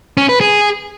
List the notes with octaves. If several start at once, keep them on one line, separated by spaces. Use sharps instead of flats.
C#4
B4
G#4